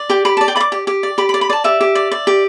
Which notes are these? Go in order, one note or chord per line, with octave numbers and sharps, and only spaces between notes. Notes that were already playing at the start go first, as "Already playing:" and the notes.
Already playing: D5
G4 G5
G4 B5
D5 A5
G5
D5 B5 D6
G4
G4
D5
G4 B5
B5
D5
B5
D5 A5
G4 E5
G4
D5
D5
G4